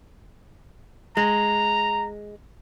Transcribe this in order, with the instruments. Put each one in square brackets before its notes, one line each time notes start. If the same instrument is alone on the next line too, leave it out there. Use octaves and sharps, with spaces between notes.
[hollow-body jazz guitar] G#3 [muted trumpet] A#5